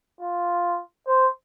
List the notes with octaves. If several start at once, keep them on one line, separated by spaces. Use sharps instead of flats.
F4
C5